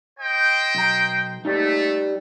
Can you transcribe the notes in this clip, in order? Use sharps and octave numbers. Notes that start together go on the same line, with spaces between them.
C5 D#5 G5
B1 A#5
G3 A3 D#4